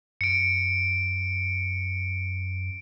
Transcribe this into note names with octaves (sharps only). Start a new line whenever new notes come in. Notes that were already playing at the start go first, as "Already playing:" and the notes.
F#2 C#7 D7